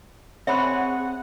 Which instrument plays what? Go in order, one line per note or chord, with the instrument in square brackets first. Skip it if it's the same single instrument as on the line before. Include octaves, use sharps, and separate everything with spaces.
[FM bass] C4 [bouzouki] G#4 C#5 [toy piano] E5 B5 C6 [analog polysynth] F#5